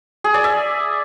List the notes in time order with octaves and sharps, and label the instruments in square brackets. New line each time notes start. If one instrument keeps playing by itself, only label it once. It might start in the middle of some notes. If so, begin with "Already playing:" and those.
[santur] G#4
D5
E5